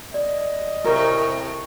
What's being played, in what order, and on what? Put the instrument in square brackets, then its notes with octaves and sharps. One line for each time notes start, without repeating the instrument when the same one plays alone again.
[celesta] D5 [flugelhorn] D#5
[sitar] A2 C3 [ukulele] A#4